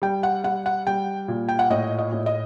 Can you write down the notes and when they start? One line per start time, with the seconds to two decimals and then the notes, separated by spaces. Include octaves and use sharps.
0.02 G3 G5
0.23 F#5
0.44 G3 F#5
0.66 F#5
0.87 G3 G5
1.28 A#2
1.49 G5
1.59 F#5
1.70 A2 D#5
1.98 D#5
2.12 A2
2.26 D#5